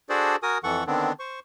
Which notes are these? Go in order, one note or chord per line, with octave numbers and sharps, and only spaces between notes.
D4 F#4 G#4 A4 C5 D5
F#4 A#4 G#5 D#6
F2 E3 A4 F#5 C#6
D3 D#3 B3 C4 D4
C5 C#6